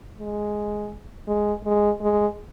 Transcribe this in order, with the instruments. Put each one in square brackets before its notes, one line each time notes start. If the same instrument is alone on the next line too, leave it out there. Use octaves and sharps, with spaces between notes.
[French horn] G#3
G#3
G#3
G#3